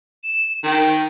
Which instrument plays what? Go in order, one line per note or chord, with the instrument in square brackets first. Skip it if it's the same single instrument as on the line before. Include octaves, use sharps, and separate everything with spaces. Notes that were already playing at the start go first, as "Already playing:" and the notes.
[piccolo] E7
[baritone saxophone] D#3 [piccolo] G5